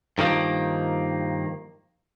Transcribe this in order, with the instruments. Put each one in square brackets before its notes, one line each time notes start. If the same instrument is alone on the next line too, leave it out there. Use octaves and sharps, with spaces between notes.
[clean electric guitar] G2 D#3 F3 A#3